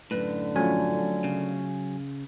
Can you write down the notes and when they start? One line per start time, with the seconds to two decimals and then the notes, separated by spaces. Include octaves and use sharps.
0.11 F#2 A2 D3 B4
0.56 F3 F#3 A3 C#4 G#5
1.24 C#3